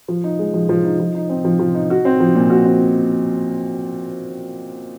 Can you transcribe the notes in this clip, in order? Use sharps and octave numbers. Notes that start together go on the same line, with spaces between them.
F3
D#4
G#3
F3
F3
D#4
F3
D#4
C4
F3
F3
D#4
F#4
C4
F3
A#2
F#4
C4